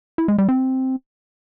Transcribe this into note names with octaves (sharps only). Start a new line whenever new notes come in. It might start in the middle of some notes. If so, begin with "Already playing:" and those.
E4
G#3
G3
C4